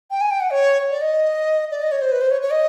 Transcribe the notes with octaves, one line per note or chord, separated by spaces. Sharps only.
G5
G#5
G5
F#5
C#5
D5
D#5
D5
D#5
C#5
C5
B4
C5
C#5
C#5
D#5